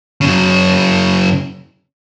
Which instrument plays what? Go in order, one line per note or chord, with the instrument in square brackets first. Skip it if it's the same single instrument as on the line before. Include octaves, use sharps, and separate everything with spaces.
[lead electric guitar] F#2 C#3